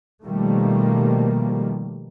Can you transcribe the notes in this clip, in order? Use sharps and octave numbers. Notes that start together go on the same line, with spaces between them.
B2 D#3 F3 G3 A3 A#3